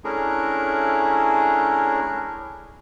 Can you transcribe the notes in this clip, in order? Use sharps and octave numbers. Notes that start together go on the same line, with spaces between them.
A3 C#4 D4 E4 G#4 A#4